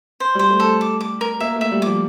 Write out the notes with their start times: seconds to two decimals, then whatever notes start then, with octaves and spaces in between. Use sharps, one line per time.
0.20 C5
0.35 G3 C5
0.50 A3
0.60 A4
0.81 D6
1.01 D6
1.21 A#4
1.40 A#3 E5
1.56 A3
1.61 E5
1.72 G3
1.82 F3 D6